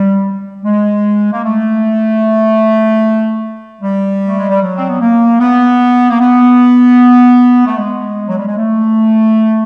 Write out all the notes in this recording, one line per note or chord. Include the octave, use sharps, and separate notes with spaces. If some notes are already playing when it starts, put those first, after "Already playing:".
Already playing: G3
G#3
A#3
A3
G3
A3
G#3
G3
F#3
C4
B3
A#3
B3
A#3
B3
A3
G#3
F#3
G3
G#3
A3